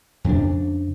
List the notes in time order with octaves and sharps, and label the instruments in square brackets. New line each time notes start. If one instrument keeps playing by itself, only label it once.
[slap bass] F2 C#3 A#3 D4